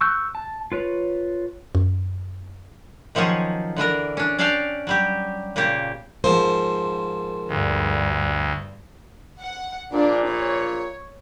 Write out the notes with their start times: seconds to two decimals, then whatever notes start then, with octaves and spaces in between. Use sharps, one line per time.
0.01 C#6 E6 F#6 G6
0.35 A5
0.72 F4 B4 C#5
1.75 F#2
3.15 D#3 F3 F#3 C#4 F4 G#4
3.77 D3 E3 D4 A#4
4.17 C#4 D4
4.38 C#4 D4 D5 F5 G5 A5
4.87 F#3 G3 G4
5.56 A#2 C#3 A#3 G4
6.24 G#2 F3 A#3 C5
7.48 D2 G2
9.38 F#5
9.92 A#1 A#2 D4
10.27 C#5